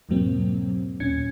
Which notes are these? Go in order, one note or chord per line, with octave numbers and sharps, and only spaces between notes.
E2 G#2 B2 F#3 A#3 C4
D#2 A#2 C#4 G#6 C#7